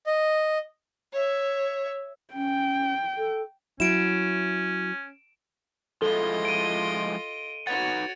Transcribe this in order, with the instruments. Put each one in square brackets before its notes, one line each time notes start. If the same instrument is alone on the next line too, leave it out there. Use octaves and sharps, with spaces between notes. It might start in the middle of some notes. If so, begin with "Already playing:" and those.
[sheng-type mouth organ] D#5
[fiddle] C#5 E5
[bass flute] C#4 [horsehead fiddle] G5
[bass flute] A4
[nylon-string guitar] F#3 E4 [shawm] C#4 [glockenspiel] D7 E7
[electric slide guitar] F3 G#3 E4 [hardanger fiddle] F4 D#5 [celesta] A4 [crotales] G7
[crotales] D7 D#7
[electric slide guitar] D#4 B4 F#5 [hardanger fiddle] F#4 C#5 [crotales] A6